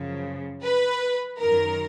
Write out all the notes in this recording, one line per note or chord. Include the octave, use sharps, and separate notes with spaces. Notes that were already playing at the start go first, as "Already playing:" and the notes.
Already playing: F#2 C#3 F3
B4
F#2 D#3 A#4